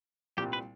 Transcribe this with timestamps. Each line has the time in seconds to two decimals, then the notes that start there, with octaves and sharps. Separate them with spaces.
0.37 C2 A#2 G3 G4
0.53 B4